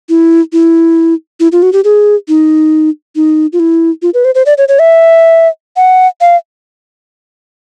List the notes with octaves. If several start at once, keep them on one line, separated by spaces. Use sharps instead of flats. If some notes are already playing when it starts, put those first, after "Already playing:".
E4
E4
E4
F4
F#4
G4
G#4
D#4
D#4
F4
E4
F4
B4
C5
C5
D5
C#5
C#5
E5
F#5
F5